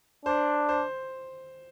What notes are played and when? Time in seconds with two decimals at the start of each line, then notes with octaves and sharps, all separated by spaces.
0.25 D4 C5
0.69 C5